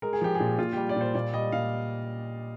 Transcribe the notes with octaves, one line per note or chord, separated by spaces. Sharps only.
G#3 A#4
G#4
F3 G4
G#4
A#2
A#2 F4
G3 G4
D5
A#2 C5
A#2 D5
G3 D#5
A#2 F5